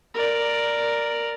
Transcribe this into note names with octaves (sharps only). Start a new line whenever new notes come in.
A#4 D5